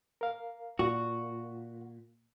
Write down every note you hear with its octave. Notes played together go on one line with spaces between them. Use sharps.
A#4 F5
A#2 F#4